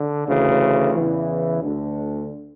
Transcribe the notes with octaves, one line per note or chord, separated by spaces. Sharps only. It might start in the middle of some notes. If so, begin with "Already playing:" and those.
Already playing: D3
D2 C#3 E3
E2 C#3 E3
D2 D3